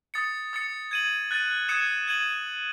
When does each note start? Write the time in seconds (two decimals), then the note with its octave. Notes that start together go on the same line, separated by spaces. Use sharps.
0.14 D#6 A6 C#7
0.53 D#6 A6 C#7
0.91 G#6 D#7 F#7
1.31 F#6 A6 D#7
1.69 D#6 G#6 C#7 E7
2.08 G#6 D#7 F#7